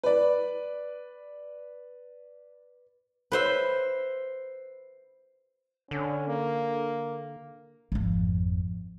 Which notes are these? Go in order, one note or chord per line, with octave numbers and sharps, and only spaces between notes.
B4 D5
B4 C5 E5
D3 C#4
A#3
G#1 F2